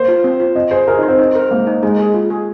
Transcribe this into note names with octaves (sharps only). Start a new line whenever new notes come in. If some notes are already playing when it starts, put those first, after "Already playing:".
Already playing: A#3 C5
F4
C4
F4
C4 D#5
G#4 C5
G#4 A#4
D#4
C5
C4
D#4
A#4
G#3 A#3
D#4
G#3 D#4
G#4
F4
G#4